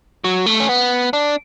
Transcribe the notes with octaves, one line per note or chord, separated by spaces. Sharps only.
F#3
A3
C#4
B3
D4